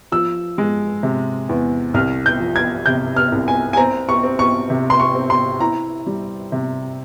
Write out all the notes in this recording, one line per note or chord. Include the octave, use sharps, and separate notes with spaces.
F3 E6
G#3
C3
E2
C2 F6
G6
F3
G#6
C3 G6
F6
C2
G#5
G#5
C4 A#5
C#6
C4
C#6
C3
C6
C#6
C4
C6
E4 A#5
G3
C3